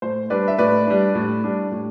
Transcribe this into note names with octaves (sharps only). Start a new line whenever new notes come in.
A2 C5
G3 D4 B4 D5
E5
A2 B4 D5
G3 D4
A2
G3 D4
A2